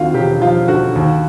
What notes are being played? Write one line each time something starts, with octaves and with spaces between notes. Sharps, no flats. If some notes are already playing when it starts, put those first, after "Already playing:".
Already playing: D#2 D3 C4 F4 F#4
E1 G4
F3 F4
D3 F#4
D#2